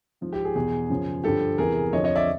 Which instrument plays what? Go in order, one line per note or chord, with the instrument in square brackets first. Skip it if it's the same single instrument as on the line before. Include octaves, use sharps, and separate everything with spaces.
[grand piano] G#2 F3
G4
G#4
E2 B2 G#4
F#2 C#3 F3
G2 D3 F3 G4 A4
E2 C3 E3 G#4 A#4
F2 D3 F3 C#5 D#5
C#5 D#5
D5 E5